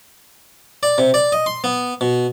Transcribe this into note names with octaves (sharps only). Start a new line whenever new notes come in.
D5
C3
D5
D#5
C6
B3
B2